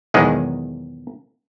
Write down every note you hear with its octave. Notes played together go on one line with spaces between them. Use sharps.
B1 E2 D#3 G#3 G#4